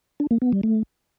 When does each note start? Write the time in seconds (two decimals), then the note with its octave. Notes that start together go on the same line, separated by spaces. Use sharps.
0.20 D4
0.31 A#3
0.42 B3
0.53 G3
0.63 A3